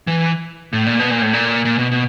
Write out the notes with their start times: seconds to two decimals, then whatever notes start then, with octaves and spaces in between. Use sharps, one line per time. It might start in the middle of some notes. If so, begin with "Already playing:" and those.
0.07 E3
0.73 A2
0.86 A#2
1.00 B2
1.10 A#2
1.22 A2
1.33 A#2
1.65 A#2
1.78 B2
1.91 B2